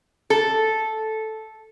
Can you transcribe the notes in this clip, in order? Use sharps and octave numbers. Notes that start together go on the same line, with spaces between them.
A4